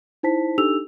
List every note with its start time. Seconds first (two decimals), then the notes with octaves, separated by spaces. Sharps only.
0.23 D#4 E4 C5 A5 B6
0.58 D4 D#4 G4 A4 E6 F7